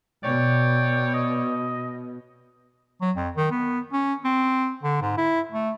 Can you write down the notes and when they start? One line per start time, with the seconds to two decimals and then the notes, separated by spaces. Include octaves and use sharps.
0.24 B2 C#5 D5 G5
1.14 D#5
3.01 F#3
3.16 F2
3.37 D#3
3.51 B3
3.93 C#4
4.25 C4
4.83 D3
5.02 G#2
5.18 E4
5.52 A3